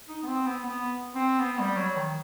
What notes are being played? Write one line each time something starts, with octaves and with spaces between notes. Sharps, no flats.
D#4
B3
C4
B3
B3
C4
B3
G3
F#3
D#3